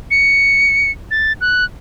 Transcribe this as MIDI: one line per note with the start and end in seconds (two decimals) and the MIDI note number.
0.11 0.91 97
1.11 1.33 93
1.41 1.65 90